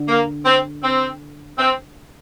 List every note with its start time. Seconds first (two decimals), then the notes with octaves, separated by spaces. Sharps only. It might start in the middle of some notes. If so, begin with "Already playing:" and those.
Already playing: D3
0.08 A#3
0.46 C4
0.83 C4
1.59 C4